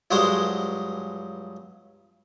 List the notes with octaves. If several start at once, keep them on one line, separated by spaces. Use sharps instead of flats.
C#2 G2 F#3 G#3 C5 D#6